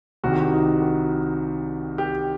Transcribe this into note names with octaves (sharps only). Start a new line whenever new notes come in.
C2 C3 D#3 F#4
G4
F#4
D#4
F#4
G4